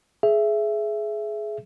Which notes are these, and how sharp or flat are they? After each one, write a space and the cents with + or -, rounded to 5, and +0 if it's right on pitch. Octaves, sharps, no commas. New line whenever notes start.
G#4 +25 E5 +15